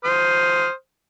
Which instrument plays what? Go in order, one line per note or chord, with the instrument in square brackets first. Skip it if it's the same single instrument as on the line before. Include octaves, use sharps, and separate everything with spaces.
[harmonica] C5 D#6 F6